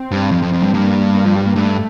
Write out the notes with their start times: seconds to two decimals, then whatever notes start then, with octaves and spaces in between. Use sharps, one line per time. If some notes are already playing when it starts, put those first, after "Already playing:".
Already playing: C4
0.11 G2
0.32 F2
0.43 F2
0.53 F2
0.63 G2
0.74 G2 A#3
1.15 A#3
1.25 F3
1.36 G3
1.46 A#3
1.56 G2 A3